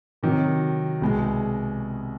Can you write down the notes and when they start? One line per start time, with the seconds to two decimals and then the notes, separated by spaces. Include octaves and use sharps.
0.23 C3 D#3 F#3
1.01 C2 B2 G#3